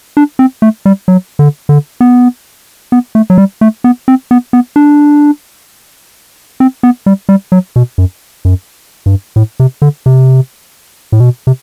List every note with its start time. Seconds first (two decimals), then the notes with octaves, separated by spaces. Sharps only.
0.17 D4
0.39 C4
0.62 A3
0.86 G3
1.08 F#3
1.39 D3
1.69 D3
2.01 B3
2.92 B3
3.15 A3
3.30 F#3
3.38 G3
3.61 A3
3.84 B3
4.08 C4
4.31 B3
4.53 B3
4.76 D4
6.60 C4
6.83 B3
7.06 G3
7.29 G3
7.52 F#3
7.76 B2
7.98 F#2
8.45 F#2
9.06 G2
9.36 A2
9.60 C3
9.82 D3
10.06 C3
11.12 A2
11.20 B2
11.47 C3